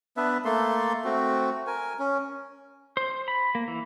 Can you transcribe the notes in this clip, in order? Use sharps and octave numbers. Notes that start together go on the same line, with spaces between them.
B3 D4 B4 E5
A3 A#3 A4 C6
A3 C4 F#4
A#4 G#5
C#4
C5
B5
A#3
E3